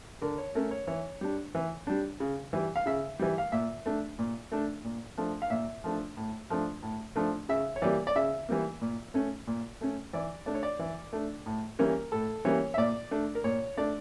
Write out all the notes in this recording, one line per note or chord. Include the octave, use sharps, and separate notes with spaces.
D3 A#4
C#5
A3 C#4 A#4
C#5
E3 C#5
G3 D4
E3
G3 D4
C#3
E3 G3
F5
C#3 E5
E3 G3
F5
A#2 E5
A3 D4
A#2
A3 D4
A#2
F3 A3 D4
F5
A#2 E5
F3 A3 D4
A2
F3 A3 D4
A2
F3 A3 D4
C#3 E5
C#5
E3 G3 A#3 D5
D5
C#3 E5
E3 G3 A#3
A#2
A3 C#4
A#2
A3 C#4
E3 D5
A3 D4 D5
C#5
D5
E3
A3 D4
A2
E3 G3 A#3 C#4 A#4
A2 A4
E3 G3 A#3 C#4 C#5
E5
A#2 D5
A3 D4
A#4
A#2 C#5
A3 D4 D5